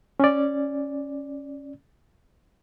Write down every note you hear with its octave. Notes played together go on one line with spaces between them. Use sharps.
C#4 D5